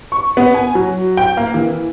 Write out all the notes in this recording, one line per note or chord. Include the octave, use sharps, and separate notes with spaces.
C#6
B3
G#5
F#3
G5
A#3
E3